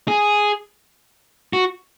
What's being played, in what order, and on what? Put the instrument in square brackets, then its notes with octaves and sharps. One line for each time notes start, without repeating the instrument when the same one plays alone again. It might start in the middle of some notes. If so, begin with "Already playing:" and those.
[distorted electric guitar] G#4
F#4